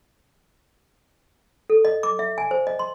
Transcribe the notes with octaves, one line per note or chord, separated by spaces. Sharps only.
A4
D#5
D6
E5
G#5
C5
D#5
C6